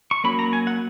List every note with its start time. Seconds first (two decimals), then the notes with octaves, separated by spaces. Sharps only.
0.11 C#6
0.24 F#3 A#3 C#4 B5
0.39 A#5
0.53 G#5
0.67 F#5